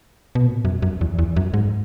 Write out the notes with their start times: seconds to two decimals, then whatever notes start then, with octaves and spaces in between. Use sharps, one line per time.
0.35 B2
0.47 A#2
0.65 F#2
0.82 F#2
1.01 E2
1.19 E2
1.36 F#2
1.54 G#2